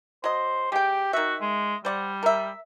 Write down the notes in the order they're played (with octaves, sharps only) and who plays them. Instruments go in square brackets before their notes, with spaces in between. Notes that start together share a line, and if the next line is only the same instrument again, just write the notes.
[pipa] F#3 D#5 [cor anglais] C5
[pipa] G#3 G5 [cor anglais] G4
[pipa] D#3 E5 [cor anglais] F#4
[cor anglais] G#3
[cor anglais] G3 [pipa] C5 D5 F#5
[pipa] A#4 E5